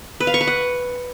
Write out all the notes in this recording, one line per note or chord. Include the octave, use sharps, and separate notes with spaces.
B4
F5
C#6
B4
F#5